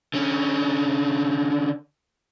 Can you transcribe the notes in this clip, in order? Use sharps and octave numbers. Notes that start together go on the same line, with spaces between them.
D3 C#4